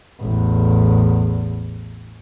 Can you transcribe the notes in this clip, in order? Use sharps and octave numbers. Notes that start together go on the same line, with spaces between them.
A1 E2